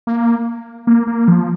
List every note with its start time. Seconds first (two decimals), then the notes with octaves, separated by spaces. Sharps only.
0.07 A#3
0.87 A#3
1.07 A#3
1.28 F3